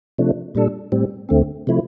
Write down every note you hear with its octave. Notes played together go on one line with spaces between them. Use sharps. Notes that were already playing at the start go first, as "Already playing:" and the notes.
C3 F3 A3 D4
A#2 G3 D4 A4
A2 G3 C4
D2 D3 A3 C4
C3 F3 A3 E4